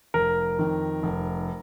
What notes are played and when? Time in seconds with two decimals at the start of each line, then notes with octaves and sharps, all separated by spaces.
0.14 F1 A#4
0.59 F2 D#3
1.03 F1